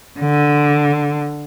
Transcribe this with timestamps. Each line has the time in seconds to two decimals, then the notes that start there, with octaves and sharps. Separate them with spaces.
0.20 D3